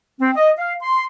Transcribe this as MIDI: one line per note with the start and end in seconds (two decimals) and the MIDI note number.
0.19 0.30 60
0.35 0.50 75
0.58 0.74 77
0.81 1.05 84